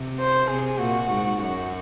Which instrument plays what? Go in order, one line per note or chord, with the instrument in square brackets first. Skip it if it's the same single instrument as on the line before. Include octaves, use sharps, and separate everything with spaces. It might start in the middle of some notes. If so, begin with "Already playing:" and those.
Already playing: [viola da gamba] C3
[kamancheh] C5
[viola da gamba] C3 [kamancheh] G#4
[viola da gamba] A#2 [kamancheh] F#4
[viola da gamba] G#2
[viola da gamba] F#2 [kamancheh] F#4